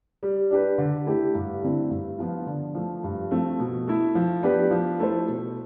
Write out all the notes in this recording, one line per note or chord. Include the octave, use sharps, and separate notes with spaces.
G3
D4 G4 B4
D3
A3 E4 G4
G2
D3 A3 C4 E4
G2
F3 B3 F4
D3
F3 A3
G2
F3 A3 C4
B2
A3 E4
F3
B3 D4 G4 B4
F3
A3 E4 A4 C5
B2